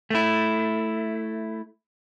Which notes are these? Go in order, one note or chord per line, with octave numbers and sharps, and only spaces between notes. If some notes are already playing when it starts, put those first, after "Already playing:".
A3 E4